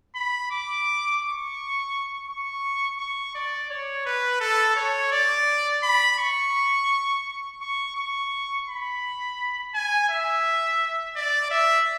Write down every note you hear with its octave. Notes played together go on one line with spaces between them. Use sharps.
B5
D6
C#6
C#6
C#6
D5
C#5
B4
A4
C#5
D5
B5
C#6
C#6
C#6
B5
G#5
E5
D5
E5